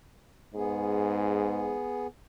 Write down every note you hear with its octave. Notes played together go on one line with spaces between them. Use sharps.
G#2 B3 G#4